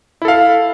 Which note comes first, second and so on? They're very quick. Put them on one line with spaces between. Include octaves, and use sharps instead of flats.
E4 A4 F5